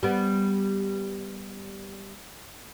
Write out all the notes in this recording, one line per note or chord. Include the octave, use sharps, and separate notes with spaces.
G3 B3